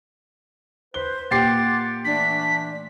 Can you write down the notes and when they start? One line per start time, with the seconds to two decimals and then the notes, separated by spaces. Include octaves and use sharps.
0.94 B4 C5 G7
1.31 A#2 G4 F#5 C6 D6 A6 C7
2.05 E3 A3 D4 B6